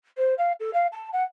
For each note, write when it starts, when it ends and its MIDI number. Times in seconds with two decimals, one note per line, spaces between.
0.17 0.34 72
0.38 0.52 77
0.60 0.71 69
0.73 0.87 77
0.92 1.09 81
1.13 1.24 78